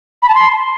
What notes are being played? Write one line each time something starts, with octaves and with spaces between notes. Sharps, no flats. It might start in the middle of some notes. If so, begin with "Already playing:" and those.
B5
A5
C6